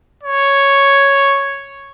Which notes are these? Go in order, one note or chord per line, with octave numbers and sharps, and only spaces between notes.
C#5